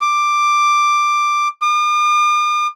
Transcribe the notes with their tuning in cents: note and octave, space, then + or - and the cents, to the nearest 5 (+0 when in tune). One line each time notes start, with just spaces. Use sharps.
D6 +10
D6 +45